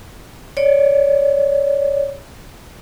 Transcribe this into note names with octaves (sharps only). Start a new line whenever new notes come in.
C#5 D5